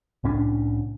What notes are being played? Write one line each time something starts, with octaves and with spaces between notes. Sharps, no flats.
C2 A2 C#4 D4